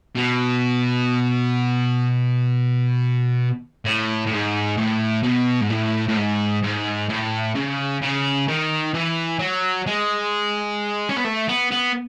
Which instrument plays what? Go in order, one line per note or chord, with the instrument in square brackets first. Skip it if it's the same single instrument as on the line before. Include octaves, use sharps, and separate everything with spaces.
[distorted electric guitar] B2
A2
A2
G#2
A2
B2
G#2
A2
A2
G#2
G#2
A2
C#3
C#3
D#3
E3
F#3
G#3
C#4
B3
A3
B3
B3